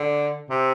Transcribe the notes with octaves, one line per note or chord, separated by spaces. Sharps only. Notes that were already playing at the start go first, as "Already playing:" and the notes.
Already playing: D3
C3